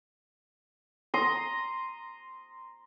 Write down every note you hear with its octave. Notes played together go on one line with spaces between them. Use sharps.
A#5 C6 D#6